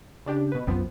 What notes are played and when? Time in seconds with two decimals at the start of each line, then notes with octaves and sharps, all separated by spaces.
0.26 C#3 D4 G4
0.52 B2 B4
0.67 B1 F#2 F3 B3 C4